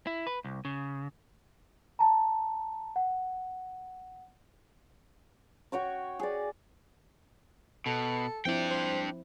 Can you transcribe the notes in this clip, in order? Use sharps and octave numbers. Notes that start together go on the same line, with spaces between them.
E4
B4
C2
C#3
A5 A#5
F#5
F#4 C#5 G5 C#6
G#4 D5
B2 A4
F3 C4 D4 E4 G5
C5